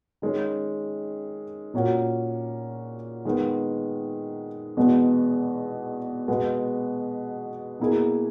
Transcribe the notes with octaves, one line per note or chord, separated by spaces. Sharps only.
D#3 G#3 C#4
A#2 A#3 C#4 F#4
D#3 G#3 B3
E2 B2 G#3 B3
B2 G#3 B3
B2 A#3 E4 G#4